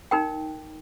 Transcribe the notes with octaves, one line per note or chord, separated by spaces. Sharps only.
D#4 A#4 G5